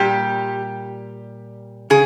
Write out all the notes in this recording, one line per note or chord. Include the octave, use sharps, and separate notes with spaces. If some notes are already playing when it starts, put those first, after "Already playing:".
Already playing: A#2 G3 G4
C#3 G#4